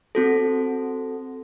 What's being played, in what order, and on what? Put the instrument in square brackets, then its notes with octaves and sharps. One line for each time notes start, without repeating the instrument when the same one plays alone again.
[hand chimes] C4 F#4 A4